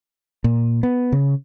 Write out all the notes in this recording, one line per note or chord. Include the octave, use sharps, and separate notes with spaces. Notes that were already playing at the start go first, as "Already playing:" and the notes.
A#2
B3
C#3